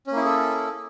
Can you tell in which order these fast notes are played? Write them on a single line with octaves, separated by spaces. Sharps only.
C#4 A#3 E4 G#4 A4